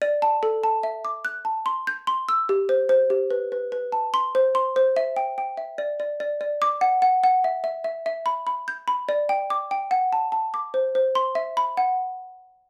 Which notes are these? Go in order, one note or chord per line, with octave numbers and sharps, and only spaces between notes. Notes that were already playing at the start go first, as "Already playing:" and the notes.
D5
A5
A4
A5
E5
D6
F#6
A5
C6
G6
C6
E6
G4
C5
C5
G4
B4
B4
B4
A5
C6
C5
C6
C5
E5
G5
G5
E5
D5
D5
D5
D5
D6
F#5
F#5
F#5
E5
E5
E5
E5
B5
B5
G6
B5
D5
G5
D6
G5
F#5
A5
A5
D6
C5
C5
C6
E5
B5
F#5